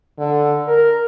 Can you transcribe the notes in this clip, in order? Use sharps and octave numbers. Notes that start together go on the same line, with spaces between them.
D3
A#4